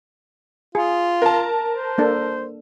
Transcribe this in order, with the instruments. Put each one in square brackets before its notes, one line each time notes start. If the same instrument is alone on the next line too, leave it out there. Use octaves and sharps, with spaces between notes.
[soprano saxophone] F4 [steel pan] G#4
[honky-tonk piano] A#4 A5
[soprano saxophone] C5
[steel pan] A#3 D4 A4